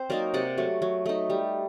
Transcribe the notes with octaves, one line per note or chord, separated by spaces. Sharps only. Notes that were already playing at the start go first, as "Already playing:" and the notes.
Already playing: C4 C5
F#3 A#3 D#4 A#4 D5
C3 D5 F#5
F#3 A3
F#3
A3 D#4
G3